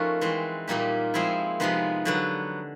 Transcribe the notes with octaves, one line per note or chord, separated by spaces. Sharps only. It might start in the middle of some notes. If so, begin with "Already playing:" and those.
Already playing: F3 A3 C#4 D#4 F#4 A#4
E3 G#3 C4
A#2 G3 A#3 D#4 G4
F3 G#3 C4 E4 G#4
C3 F3 G#3 B3 D#4
D3 F#3 B3